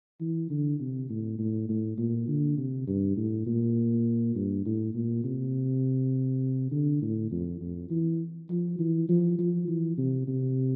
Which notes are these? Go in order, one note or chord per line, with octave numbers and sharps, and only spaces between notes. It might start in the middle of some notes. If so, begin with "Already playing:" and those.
E3
D3
C3
A2
A2
A2
A#2
D3
C3
G2
A2
A#2
G2
A2
A#2
C3
D3
A2
F2
F2
E3
F3
E3
F3
F3
E3
C3
C3